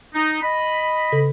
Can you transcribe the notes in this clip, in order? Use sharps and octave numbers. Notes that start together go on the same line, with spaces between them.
D#4
D#5 B5
C#3 A4